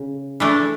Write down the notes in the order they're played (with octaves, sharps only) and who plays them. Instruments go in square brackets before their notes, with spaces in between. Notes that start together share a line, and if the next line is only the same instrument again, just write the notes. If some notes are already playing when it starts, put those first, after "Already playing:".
Already playing: [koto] C#3
E3 A3 D4